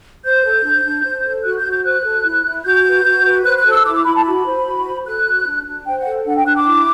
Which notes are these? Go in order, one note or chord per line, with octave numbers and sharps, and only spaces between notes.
C5 G6
A4
D4
D4
C5
A4
F#4 F#6
G6
F#4
G6
C5 F#6
A4
E4
E4
F#4 G6
B4
F#4
B4
C5 F#6
F#6
A4
E6
E4 D6
D6
E4 B5
A5
F#4 B5
C5
F#4
C5
A4 F#6
F#4
D4
D4
C5 G5
F#5
A4
D4 F#5
G5
D4 F#6
D6
E4